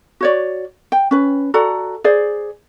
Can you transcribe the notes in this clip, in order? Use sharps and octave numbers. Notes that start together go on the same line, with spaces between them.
F#4 C#5 D5
G5
C#4 B4
F#4 A4 D5 A#5
G#4 C5 D5